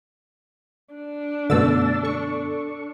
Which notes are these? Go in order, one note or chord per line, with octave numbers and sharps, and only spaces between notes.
D4
F#2 B2 D3 A3 E6 A6
A4 C#6